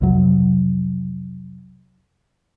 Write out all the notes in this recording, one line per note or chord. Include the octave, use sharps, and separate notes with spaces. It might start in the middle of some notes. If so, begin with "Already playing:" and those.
B1 F2 C3 F#3